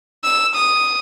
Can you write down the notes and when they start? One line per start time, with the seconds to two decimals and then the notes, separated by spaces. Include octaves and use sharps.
0.24 E6
0.56 D#6